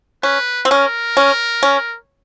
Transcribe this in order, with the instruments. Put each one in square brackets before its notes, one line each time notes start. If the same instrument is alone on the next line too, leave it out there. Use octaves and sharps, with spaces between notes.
[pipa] C#4 [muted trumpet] B4
[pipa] C4
[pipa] C#4 [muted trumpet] A#4
[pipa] C#4
C#4